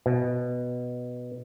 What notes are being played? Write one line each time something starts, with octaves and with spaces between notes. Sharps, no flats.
B2